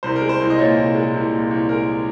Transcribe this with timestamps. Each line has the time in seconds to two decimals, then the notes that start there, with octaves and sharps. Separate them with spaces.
0.03 C2 C5
0.16 A#4
0.21 G#3
0.29 C5
0.40 C2
0.50 D#5
0.59 A#2 C#5
0.76 C2
0.95 G#3
1.14 C2
1.32 A#2
1.51 C2
1.69 G#3 A#4